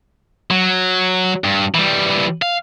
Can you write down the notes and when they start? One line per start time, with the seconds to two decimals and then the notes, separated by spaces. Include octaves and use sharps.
0.51 F#3
1.44 G2
1.75 E3 G3
2.42 F5